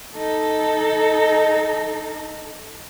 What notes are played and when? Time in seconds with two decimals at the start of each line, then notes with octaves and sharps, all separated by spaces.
0.16 D#4 A4